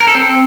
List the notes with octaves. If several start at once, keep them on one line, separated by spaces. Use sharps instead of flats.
A#4
A4
C4